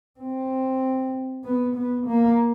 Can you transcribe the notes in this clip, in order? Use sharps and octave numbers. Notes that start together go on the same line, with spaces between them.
C4
B3
B3
A#3